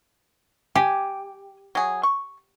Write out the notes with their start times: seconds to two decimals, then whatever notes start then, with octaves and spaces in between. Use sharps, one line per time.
0.75 G4 G#5
1.75 F#3 G#4
2.03 C#6